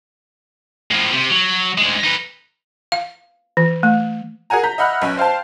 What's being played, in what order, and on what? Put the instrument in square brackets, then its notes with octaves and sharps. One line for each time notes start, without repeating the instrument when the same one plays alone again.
[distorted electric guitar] A2 F3
C3
F#3
D2 G#3
D#4 B4
[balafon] F5
E3
A3
[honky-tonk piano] G#4 A#4 F#5 G#5 A#5
A#5 G6 B6
D#5 E5 F#5 B5 F6 F#6
B1 C#4
C5 F5 G5 A5